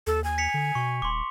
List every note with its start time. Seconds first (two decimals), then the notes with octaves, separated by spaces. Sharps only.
0.07 D#2 A4
0.24 G#5
0.38 B6 C#7 F7
0.54 D3
0.75 B2 C#6
1.02 D#1 C6 D6